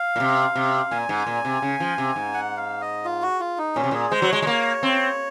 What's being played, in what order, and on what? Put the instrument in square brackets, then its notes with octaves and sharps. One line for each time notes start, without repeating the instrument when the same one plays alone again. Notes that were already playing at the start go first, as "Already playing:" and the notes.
Already playing: [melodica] F5
[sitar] A#2
C3
C3
[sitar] A#2 [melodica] G#5
[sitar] G#2
A#2
C3
C#3
F3
C3
G#2
[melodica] F#5
F5
D#5
F4
F#4
F4
D#4
[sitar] A#2 [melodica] C#4
[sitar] C3
[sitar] A#2 [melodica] G#4
[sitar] G#3 [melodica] C5
[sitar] F#3
[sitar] G#3 [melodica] C#5
[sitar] G#3
A#3
C4